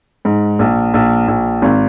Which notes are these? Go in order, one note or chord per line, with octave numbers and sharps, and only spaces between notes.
G#2
A#1
A#1
A#1
G#1